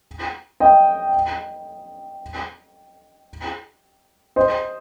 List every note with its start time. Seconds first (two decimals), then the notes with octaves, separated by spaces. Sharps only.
0.60 D#5 G5
4.36 C5 D#5